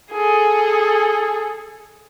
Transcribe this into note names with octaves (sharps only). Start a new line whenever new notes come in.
G#4 A4